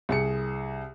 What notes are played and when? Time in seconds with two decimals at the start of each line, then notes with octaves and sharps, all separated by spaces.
0.09 C2 G#4 C#7